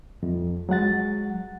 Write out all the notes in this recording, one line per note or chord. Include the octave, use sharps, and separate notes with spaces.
F2
F#3 G#3 F#5 A6